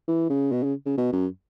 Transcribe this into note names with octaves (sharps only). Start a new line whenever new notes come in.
E3
C#3
B2
C#3
C#3
B2
F#2